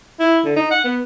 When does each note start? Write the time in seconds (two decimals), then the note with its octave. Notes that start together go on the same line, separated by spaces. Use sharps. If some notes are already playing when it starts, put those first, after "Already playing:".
0.20 E4
0.44 D3
0.56 D#4
0.71 F#5
0.84 B3